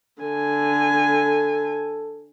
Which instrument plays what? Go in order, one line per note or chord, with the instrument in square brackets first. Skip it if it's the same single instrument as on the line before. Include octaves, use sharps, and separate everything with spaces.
[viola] D3 G#5 [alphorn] A4